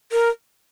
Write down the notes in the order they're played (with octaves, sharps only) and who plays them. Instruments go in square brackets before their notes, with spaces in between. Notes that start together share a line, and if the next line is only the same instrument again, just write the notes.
[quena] A#4